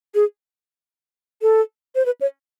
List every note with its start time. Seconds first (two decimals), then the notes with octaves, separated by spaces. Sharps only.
0.15 G#4
1.42 A4
1.95 C5
2.06 B4
2.21 C#5